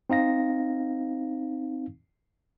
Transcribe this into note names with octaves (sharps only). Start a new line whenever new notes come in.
C4 D#4 F5 A#6